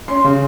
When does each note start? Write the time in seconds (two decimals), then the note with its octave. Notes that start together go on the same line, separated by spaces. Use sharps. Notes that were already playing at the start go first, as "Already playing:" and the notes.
0.08 C#4 C6
0.24 C#3